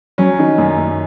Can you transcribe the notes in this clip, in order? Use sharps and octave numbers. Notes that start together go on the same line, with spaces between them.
F#3 C#4
D#3
F#2
F#2